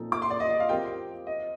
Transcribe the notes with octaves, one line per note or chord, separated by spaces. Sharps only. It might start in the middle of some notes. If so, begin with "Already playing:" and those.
Already playing: A#2 F3 C4 D#4 A4
D6
C6
D5
D#5
D#5
F5
F3 C4 G4 A#4 G5
D#5